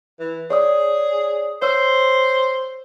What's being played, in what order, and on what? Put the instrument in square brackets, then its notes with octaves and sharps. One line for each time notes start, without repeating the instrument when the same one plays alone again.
[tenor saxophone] E3
[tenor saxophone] G#4 [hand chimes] C#5 D5 D#6
[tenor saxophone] C5 [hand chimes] C#5 E6